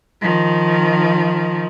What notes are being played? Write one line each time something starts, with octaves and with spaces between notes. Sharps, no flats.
D#3 F3